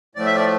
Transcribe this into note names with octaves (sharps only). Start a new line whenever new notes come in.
A2 F3 A3 D5
E5
D5